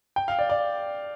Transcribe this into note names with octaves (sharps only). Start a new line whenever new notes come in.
G5
F5
D5
D5